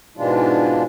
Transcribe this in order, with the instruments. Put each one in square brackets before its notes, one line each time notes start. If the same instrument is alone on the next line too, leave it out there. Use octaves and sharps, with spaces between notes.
[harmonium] G#2 B2 E3 G#3 D4 F4